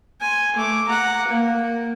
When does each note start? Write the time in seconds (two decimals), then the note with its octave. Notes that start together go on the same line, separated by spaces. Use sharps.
0.21 G#5 C6
0.56 A3 D6
0.88 F#5 A#5
1.28 A#3